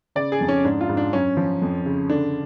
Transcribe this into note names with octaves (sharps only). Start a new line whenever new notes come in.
C#3 D5
G#4
F2
C#4
G#2 D4
F4
G#2
D4
F#2 C#4
F3
F2
C#3
D3 D4